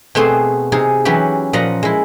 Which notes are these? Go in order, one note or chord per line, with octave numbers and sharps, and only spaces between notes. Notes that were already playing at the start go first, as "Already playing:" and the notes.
B2 A3 C4 G#4 C5
C3 D#4 G#4
E3 F#3 C#4 E4 G4
A#2 F3 D#5 F#5 A#5
G#3 E4